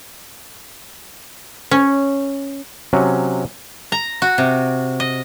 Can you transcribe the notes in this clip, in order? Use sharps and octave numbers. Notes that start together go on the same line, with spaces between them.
C#4
C3 F#3 C#4
A#5
F#4
C3
D#5